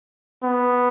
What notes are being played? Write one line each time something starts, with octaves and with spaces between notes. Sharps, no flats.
B3